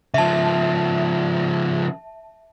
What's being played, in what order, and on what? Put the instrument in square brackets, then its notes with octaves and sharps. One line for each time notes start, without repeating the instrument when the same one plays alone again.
[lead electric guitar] C#3 F3 [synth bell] E5 A5